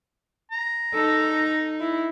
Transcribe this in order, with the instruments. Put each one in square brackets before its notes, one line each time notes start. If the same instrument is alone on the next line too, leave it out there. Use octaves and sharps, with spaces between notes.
[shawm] A#5
[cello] D#4 [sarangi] A4
[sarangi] E4